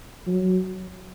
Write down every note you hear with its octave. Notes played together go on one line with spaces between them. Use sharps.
F#3